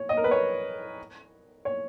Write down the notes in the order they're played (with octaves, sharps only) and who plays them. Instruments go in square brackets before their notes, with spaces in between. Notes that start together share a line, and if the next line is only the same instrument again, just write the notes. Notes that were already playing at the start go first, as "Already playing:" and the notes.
Already playing: [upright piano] C#5
D#5
A#4
B4
C#5
C#5